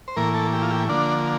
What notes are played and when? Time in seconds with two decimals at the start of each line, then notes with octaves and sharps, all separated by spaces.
0.08 C5
0.16 A2 E3 A#3 A#4
0.34 A4
0.53 G4
0.62 F4
0.71 G4
0.89 D3 F3 A#3 D4